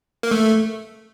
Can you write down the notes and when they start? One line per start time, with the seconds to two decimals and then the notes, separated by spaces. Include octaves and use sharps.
0.23 A#3
0.31 A3